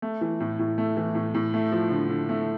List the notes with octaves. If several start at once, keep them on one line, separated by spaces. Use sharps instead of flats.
A3
E3
A2
A2
A3
E3
A2
A2
A3
F3
D3
D3
A3